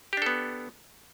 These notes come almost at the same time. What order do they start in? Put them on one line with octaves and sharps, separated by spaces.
G4 D4 A4 B3